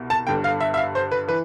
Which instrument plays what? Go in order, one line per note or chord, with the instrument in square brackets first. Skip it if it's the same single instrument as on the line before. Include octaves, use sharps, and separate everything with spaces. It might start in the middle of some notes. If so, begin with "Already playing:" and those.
Already playing: [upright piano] C2 B2
A5
G1 G2 D3 G5
F5
E5
E5
F5
C5
B4
E3 B4